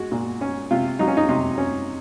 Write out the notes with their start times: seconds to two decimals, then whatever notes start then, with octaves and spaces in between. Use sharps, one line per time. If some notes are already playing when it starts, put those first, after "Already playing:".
Already playing: G#3 F#4
0.12 A#2
0.41 C#4
0.71 C3 F4
0.99 F#3 D#4
1.08 C#4
1.17 D#4
1.29 C3 D#4
1.58 C#4